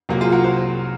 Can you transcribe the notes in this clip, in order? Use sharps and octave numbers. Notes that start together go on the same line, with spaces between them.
C2 C3 F#3 A#3
F4 G#4
F#4 A#4
C5